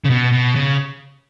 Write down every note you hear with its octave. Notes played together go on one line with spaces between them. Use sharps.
C#3
B2
B2
C#3